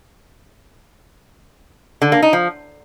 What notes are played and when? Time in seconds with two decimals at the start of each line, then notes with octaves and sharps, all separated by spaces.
2.02 D3
2.12 A#3
2.22 D#4
2.33 F3